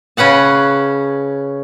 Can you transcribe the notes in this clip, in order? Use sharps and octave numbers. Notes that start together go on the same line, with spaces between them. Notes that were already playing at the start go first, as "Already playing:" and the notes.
C#3 C#4 B4 F#5 A5